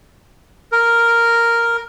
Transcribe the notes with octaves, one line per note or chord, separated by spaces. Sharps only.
A#4